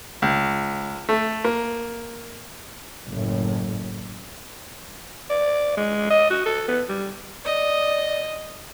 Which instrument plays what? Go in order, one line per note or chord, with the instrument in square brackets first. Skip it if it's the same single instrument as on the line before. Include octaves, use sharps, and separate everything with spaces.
[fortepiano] C#2
A3
A#3
[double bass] F#1 A2
[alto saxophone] D5
G#3
D#5
F#4
A4
B3
G3
[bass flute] D5 [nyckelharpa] D#5